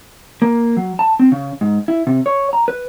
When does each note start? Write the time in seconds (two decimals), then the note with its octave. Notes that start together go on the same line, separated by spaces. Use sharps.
0.42 A#3
0.77 F#3
0.99 A5
1.19 C4
1.32 C#3
1.61 G#2
1.88 E4
2.07 C3
2.26 C#5
2.53 A#5
2.68 B4